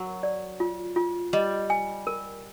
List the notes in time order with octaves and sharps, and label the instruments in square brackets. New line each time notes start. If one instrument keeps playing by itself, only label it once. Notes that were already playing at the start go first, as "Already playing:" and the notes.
Already playing: [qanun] F#3 [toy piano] A#4
[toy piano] D5
F4
F4
[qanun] G3 [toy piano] D#5
[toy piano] G#5
A#4